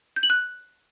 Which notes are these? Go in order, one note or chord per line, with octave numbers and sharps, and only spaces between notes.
G6
F#7
F#6